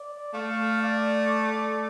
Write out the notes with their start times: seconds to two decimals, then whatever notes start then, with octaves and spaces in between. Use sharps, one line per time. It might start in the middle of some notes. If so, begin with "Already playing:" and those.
Already playing: D5
0.34 A3 F5
0.82 D5
1.31 D5